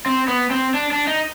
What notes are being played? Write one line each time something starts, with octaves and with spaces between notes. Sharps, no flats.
C4
B3
C4
D4
D4
D#4